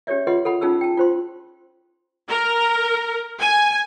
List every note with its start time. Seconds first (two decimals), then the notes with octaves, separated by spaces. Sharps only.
0.07 C#4 G4 G#4 C#5 D5 E5
0.27 F4 G#4 B4 D#5 F#5 C6
0.45 A4 F#5 B5
0.61 C#4 D#4 F4 G#4 A5 E6
0.81 G5 A5
0.97 F4 C5 C6
2.29 A#4
3.40 G#5